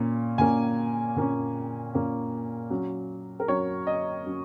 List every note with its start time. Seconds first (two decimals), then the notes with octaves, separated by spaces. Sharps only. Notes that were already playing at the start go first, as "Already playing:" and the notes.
Already playing: A#2 A#3 C#4
0.38 A#2 A#3 C#4 G#5
1.16 A#2 A#3 C#4
1.94 A#2 A#3 C#4
2.70 F#3 C#4
3.40 A#4
3.48 F#3 C#4 C#5
3.87 D#5
4.26 F#3 C#4